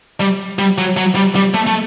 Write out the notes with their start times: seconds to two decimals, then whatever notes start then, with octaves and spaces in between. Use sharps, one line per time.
0.20 G3
0.59 G3
0.78 F#3
0.97 F#3
1.15 G3
1.35 G3
1.54 A3
1.67 A3